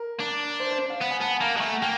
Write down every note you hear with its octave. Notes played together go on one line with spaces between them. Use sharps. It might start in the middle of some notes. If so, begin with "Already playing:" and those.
Already playing: A#4
D4
C5
C5
F5
B3 F#5
G#5
B3 A5
G#5
A#3 A#5
G#3 A5
A3 G#5
F#5
A#3 G5